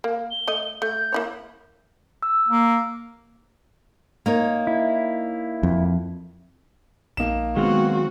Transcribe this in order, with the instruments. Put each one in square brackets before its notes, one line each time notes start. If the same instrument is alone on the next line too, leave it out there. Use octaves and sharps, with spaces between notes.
[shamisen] A#3
[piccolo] G7
[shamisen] A3 D#5
[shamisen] A3 [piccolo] G6
[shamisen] A#3 E4 C#5
[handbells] E6
[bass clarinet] A#3
[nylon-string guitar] A#3 D#4 C#5
[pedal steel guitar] E4
[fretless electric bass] F2
[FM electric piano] A#1 [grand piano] A#3 D#4 E7
[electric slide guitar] D#3 F#3 F4 [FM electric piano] G#3 B3 [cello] C4 F#4